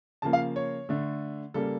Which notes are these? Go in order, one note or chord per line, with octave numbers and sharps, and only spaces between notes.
C#3 F3 A#3 A5
F5
C#5
D3 A3
C#3 G3 A#3 A4